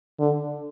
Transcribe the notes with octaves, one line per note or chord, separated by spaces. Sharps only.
D3